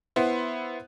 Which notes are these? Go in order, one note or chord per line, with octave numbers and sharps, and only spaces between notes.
B3 E4 C5